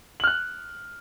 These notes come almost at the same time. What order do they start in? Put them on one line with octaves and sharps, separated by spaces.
F#7 F6 F#6